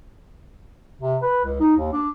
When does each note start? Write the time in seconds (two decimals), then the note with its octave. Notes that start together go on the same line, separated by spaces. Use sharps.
1.01 C3
1.22 B4
1.44 C#2
1.60 D#4
1.77 D#2
1.93 D4